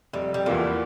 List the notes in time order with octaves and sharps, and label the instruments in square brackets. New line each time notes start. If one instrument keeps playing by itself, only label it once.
[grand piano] F1 [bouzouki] G3
[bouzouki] G3
[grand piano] E2 E3 A#3 F4 [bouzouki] A3